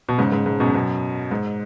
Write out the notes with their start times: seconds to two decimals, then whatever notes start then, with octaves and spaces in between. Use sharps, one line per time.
0.09 B2
0.18 G#2 C#3
0.32 G#2
0.46 G#2
0.60 F#2 B2
0.74 F#2 B2
1.31 G#2